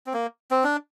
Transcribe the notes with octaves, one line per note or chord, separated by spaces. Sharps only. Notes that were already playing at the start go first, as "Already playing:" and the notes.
C4
A#3
C4
D4